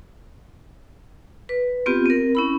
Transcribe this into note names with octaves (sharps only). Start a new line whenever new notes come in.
B4
B3 C4 F4 G4
C4 A#4
C#4 E4 B5